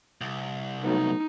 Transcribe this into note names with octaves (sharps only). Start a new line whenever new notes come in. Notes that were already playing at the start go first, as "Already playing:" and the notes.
C2
F#3 A3 B3 D#4